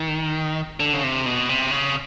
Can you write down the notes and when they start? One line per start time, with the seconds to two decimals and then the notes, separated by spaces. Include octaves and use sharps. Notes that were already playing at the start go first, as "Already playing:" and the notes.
Already playing: D#3
0.80 D3
0.94 C#3
1.03 C3
1.26 B2
1.49 C3
1.71 C#3